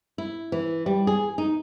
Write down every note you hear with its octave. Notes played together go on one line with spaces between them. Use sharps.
E4
E3
G3
G#4
D#4